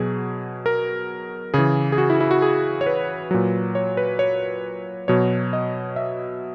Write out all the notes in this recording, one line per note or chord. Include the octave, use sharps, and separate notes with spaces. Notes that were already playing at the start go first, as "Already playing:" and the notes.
Already playing: B2 F#3 G#4
A#4
C#3 E3 G#4
G#4
F#4
E4
E4
F#4
G#4
C#5
B4
A#2 F#3
C#5
B4
C#5
B2 F#3 C#5
D#5
E5